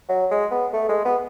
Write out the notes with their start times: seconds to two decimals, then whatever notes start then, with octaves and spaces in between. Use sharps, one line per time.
0.09 F#3
0.31 G#3
0.51 B3
0.73 A3
0.89 G#3
1.05 B3